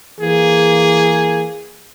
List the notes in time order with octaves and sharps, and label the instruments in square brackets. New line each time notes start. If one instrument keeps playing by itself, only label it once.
[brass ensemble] E3 A#3 G#4